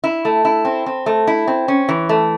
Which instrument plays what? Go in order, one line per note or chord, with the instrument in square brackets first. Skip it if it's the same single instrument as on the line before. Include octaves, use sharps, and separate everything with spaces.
[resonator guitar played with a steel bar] E4
A3
E4
C4
C4
A3
E4
C4
C#4
E3
A3